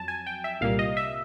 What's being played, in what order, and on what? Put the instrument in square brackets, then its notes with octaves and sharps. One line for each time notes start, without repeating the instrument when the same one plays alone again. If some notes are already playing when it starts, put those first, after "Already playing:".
Already playing: [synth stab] F2 F#3 A5
G#5
G5
E5
C2 A#2 G3 A#3 F5
D#5
E5